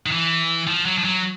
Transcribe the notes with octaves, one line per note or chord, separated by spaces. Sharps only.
D#3
E3
F3
F#3
F3
F#3